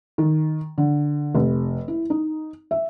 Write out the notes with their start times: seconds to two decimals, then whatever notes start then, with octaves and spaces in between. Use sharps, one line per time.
0.18 D#3
0.78 D3
1.35 F1
1.88 E4
2.10 D#4
2.71 E5